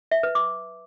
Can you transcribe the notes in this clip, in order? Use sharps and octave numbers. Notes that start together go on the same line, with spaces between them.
E5
B4
D6